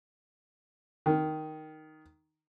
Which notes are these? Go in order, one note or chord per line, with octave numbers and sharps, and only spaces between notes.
D#3